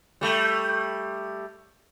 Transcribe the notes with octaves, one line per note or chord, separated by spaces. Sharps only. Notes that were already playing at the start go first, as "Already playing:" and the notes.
G3 A3